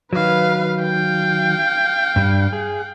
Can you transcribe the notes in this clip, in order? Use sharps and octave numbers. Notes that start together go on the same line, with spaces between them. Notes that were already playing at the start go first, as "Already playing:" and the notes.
D#3 F#3 B4 F5
F5 G5
G2 G3 D4
G#4